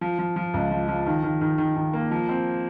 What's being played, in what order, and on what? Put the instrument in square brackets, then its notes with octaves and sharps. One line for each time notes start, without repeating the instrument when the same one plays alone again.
[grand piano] F3
F3
F3
C#2
F3
F3
D#3
D#3
D#3
D#3
D#3
A#3
F3
C4